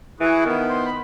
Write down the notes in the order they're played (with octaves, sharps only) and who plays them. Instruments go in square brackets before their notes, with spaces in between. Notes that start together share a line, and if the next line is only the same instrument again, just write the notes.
[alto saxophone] E3 [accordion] E4 G#4 [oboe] F#4
[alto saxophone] D#3 [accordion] B3
[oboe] C5
B5